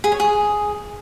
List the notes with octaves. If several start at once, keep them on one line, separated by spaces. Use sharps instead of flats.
G#4
C#5
G#4